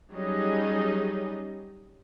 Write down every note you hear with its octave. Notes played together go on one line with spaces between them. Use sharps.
F#3 G3 C#4 D#4 G#4 D#5